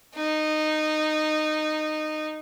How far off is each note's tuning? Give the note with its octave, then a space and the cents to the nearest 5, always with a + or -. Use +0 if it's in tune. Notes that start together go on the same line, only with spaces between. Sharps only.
D#4 -15